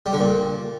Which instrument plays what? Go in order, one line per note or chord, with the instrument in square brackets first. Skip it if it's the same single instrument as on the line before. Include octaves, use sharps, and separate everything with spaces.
[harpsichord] G3
D3
A#2